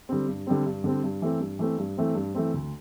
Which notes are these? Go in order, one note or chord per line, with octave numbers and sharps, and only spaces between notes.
D3 G3 C4
G2
D3 G3 C4
G2
D3 G3 C4
G2
E3 A3 C4
G2
E3 A3 C4
G2
E3 A3 C4
G2
E3 A3 C4
D2